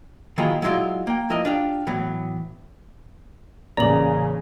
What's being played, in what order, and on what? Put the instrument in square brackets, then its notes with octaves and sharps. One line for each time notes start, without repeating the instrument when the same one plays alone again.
[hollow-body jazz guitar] D#3 F#3 A#3 E4 F4 G#4
F#3 G#3 E4 F4 D5
A#3 G5
F3 E4 A#4 D5 D#5
D4 F4 G4
A2 E3 F#3 B3
[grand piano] A1 A#3 [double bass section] C#3 [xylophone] D5 F#7 [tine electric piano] A#5